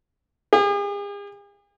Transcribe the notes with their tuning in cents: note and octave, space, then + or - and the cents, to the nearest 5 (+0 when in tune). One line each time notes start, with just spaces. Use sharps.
G#4 -45